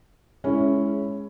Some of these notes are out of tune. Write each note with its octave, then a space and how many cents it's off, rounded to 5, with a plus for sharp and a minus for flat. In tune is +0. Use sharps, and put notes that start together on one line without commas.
G#3 +0 C#4 +0 E4 +0